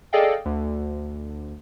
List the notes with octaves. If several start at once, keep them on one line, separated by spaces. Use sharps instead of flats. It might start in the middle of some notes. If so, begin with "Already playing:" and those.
G#4 A4 D5 D#5 F5 G5
D2